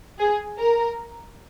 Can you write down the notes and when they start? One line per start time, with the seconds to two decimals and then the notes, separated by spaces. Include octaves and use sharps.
0.19 G#4
0.59 A#4